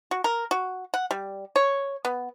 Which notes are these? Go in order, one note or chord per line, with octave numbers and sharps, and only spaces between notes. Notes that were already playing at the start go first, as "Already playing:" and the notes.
F#4
A#4
F#4
F#5
G3
C#5
B3